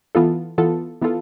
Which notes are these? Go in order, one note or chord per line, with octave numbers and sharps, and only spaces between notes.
E3 B3 F4 A4
E3 B3 F4 A4
E3 B3 F4 A4